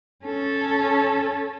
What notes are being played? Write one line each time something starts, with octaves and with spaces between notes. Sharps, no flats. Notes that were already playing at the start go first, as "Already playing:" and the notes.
C#4 A4